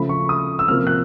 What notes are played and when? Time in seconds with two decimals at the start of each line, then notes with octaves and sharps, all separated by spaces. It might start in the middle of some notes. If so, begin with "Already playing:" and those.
Already playing: C#3 F3 A3 B5
0.09 C#6
0.29 D#6
0.59 E6
0.68 C3 F3 A#3 F6
0.87 F#6